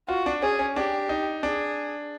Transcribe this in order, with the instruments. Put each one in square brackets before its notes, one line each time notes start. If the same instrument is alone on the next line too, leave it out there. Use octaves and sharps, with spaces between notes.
[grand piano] F4 [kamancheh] F#4
[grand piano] D4
[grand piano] C#4 [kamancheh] G#4
[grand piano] C#4
[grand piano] D4 [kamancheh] G4
[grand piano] D#4
[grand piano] D4 [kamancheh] G#4